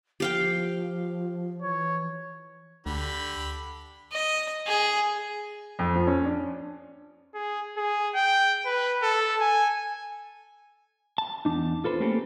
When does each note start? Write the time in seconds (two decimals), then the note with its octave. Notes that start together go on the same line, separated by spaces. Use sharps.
0.20 F3 G4 F5 G5
1.62 E3 C#5
2.86 D2 D3 G4 B5
4.12 D#5
4.67 G#4
5.79 F2
5.96 F3
6.07 C#4
6.25 D4
7.35 G#4
7.77 G#4
8.15 G5
8.65 B4
9.03 A4
9.41 G#5
11.18 A5
11.45 E2 D4 D#4
11.84 F4 A4 B4 C5
12.00 A3 A#3 C4 C#4 G4 A4